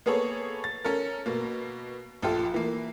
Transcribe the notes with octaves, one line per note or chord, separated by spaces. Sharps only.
A#3 B3 G#4 A4 C#5
A6
C#4 A4 A#4
B2 A#3
A#1 F4 G4 A4
E3 A#3